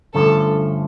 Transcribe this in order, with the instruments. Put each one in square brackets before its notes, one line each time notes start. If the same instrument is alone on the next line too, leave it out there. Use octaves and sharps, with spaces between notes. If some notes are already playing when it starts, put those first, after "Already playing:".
[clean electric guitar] G2 D3 F3 A3 C#4 [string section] A4